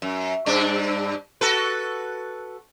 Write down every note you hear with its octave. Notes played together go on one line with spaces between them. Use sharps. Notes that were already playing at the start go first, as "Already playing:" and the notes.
F#2
G2 D4
F#4 A4 B4